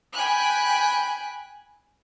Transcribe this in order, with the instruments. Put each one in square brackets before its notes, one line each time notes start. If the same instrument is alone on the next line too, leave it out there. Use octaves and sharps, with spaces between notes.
[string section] G5 G#5 B5 F#6